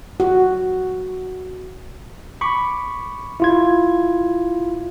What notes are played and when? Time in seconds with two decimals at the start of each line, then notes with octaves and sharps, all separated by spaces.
0.20 F#4
2.41 B5 C#6 D6
3.40 E4 F4 G#6